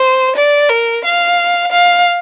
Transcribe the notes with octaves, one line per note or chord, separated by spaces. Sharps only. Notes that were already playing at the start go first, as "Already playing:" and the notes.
Already playing: C5
D5
A#4
F5
F5